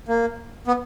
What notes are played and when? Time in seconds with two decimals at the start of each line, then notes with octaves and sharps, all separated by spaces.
0.08 A#3
0.67 B3